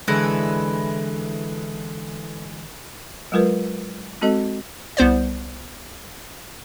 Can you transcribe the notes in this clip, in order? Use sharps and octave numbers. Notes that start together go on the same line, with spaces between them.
D3 E3 G#3 E4 A4 B4 F#6 A#6
F#3 G#3 F4 A#4 B4
G#3 C4 F#4 A4 D#5
C2 B3 C5 D5